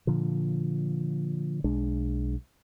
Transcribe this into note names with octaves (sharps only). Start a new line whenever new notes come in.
A#2 D3 F3
B1 G#3 D4